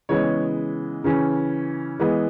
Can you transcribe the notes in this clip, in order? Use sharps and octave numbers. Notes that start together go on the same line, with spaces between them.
C#3 E3 G#3 B3 C#5
C#3 E3 C#4
E3 G#3 B3